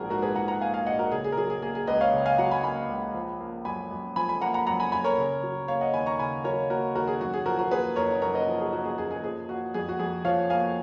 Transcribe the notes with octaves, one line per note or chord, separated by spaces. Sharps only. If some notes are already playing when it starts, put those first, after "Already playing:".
Already playing: A#1 G#2 F3 A#3 F#4 G#4 A#4
G#2 F#4 A#4
G#4 B4
F3 F#5 A#5
F#5 A#5
A#3 F5 G#5
F5 G#5
A#1 D#5 F#5
F#4 A#4
C#3 G#4
G#4
A#4
F#3 G#4
G#4
A#3 G#4
G#4
C#2 B4 D#5
C#5 F5
C#3
F5 G#5
F#3 F#5 A#5
G#5 B5
A#3 G#5 B5
C#2
F3
A#3
F#2 G#5 B5
F#2
F3 G#5 B5
G#5 B5
A#3 F#5 A#5
F#5 A#5
F#2 F#5 A#5
G#5 B5
F#2 G#5 B5
A#4 C#5
C#3
F#3
A#3 C#5 F5
D#5 F#5
D#2 G#5 B5
A#5 C#6
C#3 G#5 B5
F#3 A#4 C#5
A#3 F#4 A#4
D#2 F#4 A#4
G#4
F#2 F#4
G#4
F3 F#4 A#4
F#4 A#4
A#3 G#4 B4
F#1 A#4 C#5
F#2 A#4 C#5
B4 D#5
F3
G#4
A#3 F#4
G#4
F#1 G#4
G#4
F3 G#4
A#3 F#4
F2 G#4
F#4
F2 G#4
F3 C#5 F5
A#3 F5 G#5